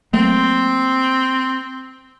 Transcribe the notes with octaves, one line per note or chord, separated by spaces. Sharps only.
F#3 A3 A#3 C4